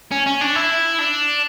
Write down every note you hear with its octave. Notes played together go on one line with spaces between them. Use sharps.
C#4
C#4
D4
E4
D4